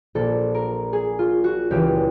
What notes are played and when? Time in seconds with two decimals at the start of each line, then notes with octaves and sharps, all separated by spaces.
0.15 A#1 A#2 A4
0.55 A#4
0.93 G#4
1.19 F4
1.44 F#4
1.71 C#2 C#3 E3 G4